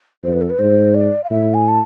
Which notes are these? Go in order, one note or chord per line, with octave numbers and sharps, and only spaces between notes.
F2 C5
B4
A4
B4
G#2 C5
D5
F5
A2 E5
G#5
A5